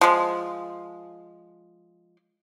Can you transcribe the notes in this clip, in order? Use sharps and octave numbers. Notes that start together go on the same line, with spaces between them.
F3 G#3